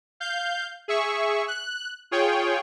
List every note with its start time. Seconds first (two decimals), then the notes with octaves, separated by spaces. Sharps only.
0.20 F5 G6
0.88 G#4 E5 C#6
1.48 F#6
2.11 F4 G#4 C#5 G5